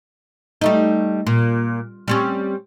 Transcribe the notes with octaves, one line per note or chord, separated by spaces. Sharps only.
G3 A3 D#4
A#2
G3 C4 C#4